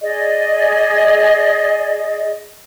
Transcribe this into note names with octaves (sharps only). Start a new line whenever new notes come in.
G#4 D5 D#5